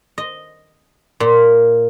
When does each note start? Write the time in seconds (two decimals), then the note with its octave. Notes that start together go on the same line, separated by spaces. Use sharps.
0.18 D#5
1.20 A#2